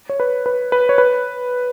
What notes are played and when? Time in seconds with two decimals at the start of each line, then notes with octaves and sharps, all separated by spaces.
0.09 C#5
0.20 B4
0.46 B4
0.72 B4
0.89 C#5
0.98 B4